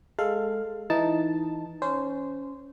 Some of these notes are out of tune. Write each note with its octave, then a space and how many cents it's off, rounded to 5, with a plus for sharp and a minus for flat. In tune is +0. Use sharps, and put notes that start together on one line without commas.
G#3 +0 A4 +10 F5 +0
E3 +0 D#4 +0 A5 +0
C#4 +5 C5 -15